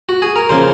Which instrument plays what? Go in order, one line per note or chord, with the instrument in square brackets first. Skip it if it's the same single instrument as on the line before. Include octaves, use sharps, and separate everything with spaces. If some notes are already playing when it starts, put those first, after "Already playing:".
[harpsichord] F#4
G#4
A#4
[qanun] C#3 F3 A#3 C#4 [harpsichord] C5